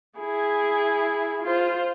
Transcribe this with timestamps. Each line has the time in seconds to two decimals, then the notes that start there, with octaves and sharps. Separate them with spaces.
0.19 E4 G#4
1.43 F4 C5